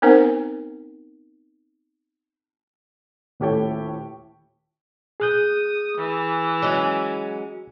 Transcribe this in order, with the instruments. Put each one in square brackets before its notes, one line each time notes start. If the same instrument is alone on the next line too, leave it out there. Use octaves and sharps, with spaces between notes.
[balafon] B3 C4 D#4 A#4 C5 F#5
[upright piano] D#1 A2 G4 A4 C#5 G5
[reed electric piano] G#4 F#6 G6 [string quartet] D#6
[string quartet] E3
[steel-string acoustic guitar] F#3 G#3 C#4